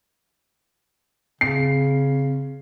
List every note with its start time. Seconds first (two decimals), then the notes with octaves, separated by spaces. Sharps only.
1.41 C#3 C4 C7